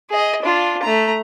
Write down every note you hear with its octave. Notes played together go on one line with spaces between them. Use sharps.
G#4 D#5
D4 F4
A3 A#5